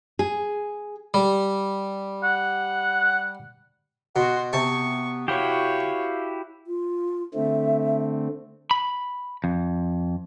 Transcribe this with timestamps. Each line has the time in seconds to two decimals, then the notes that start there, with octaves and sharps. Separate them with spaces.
0.19 G#4
1.14 G3
2.24 F#5
4.16 B2 F#4 F#5 C6
4.53 C3 B3 A5 C#6
5.28 E4 F#4 G4 C#5 F5
6.67 F4
7.34 D3 A3 C4 E5
8.71 B5
9.44 F2